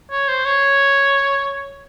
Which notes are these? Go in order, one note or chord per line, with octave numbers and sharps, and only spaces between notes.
C#5
C5
C#5